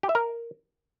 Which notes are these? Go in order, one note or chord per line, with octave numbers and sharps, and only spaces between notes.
G4
E5
A#4